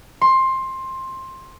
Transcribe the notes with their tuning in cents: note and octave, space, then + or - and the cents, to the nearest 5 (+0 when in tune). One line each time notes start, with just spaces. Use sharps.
C6 +15